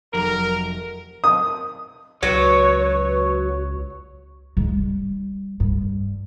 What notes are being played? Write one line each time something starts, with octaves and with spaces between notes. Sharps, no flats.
F1 F#3 A#4
D#6
C#2 F#3 B4 C#5
G#2
G3
G2